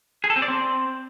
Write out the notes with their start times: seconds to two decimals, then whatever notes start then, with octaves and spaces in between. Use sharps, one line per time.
0.24 G#4
0.30 A4
0.36 C4
0.42 D5
0.48 C4